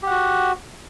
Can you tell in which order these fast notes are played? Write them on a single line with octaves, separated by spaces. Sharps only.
G4 F#5 F#4